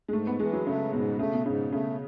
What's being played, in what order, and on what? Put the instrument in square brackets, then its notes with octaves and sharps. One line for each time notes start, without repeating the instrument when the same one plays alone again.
[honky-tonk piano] G#3
[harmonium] G#2 [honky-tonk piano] A3
[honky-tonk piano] B3
[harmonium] E3 [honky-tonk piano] G#3
[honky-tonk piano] F#3
[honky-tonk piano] C#3 [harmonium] A3
[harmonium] G#2 [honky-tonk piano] B2
[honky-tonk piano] C#3 [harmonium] A3
[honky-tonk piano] B2
[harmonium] G#2 [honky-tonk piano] C#3
[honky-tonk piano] C#3 [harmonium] A3